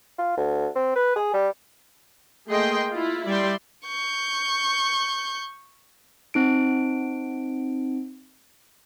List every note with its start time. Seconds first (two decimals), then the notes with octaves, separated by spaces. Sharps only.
0.18 F4
0.37 D2
0.76 C4
0.96 B4
1.16 G#4
1.33 G3
2.48 A3 A#3 G#4 D#5 G5 C6
2.92 E4 F4
3.26 G3 D5 E5 G5 C6
3.87 C#6 G6
6.34 C4 D#4 D7